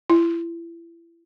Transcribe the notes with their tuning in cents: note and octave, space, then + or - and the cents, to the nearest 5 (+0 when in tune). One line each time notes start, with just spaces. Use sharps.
E4 +30